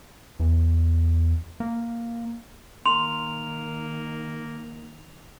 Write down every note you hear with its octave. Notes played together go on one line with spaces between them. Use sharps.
E2
A#3
D#3 A#3 C6 F7